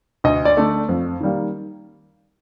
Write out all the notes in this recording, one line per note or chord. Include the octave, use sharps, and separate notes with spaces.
D2 D#5
D5
D3 A3
F2
D#3 G3 A#3